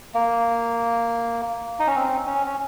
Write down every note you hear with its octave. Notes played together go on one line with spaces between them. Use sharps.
A#3
D#4
C#4
C4
C#4
C#4